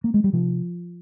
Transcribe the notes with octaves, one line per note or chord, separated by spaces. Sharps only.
A#3
G#3
G3
C3 F3